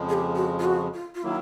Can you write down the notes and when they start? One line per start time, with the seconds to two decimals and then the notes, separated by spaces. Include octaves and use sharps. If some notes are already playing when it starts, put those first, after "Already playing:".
Already playing: F2 C#3 F3 G#3
0.09 G#4
0.13 G4
0.36 F#4
0.59 F4
0.65 F#4
0.94 F4
1.15 F4
1.23 D#3 F#3 A#3 E4